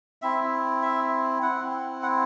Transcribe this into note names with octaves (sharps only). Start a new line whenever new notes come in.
C4 E4 E5
E5
C4 E4 F#5
F#5